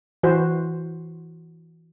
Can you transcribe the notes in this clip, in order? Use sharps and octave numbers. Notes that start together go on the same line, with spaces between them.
E3 F#4 C5